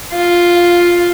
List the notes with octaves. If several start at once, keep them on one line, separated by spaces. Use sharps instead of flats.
F4